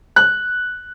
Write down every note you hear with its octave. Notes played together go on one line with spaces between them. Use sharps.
F#6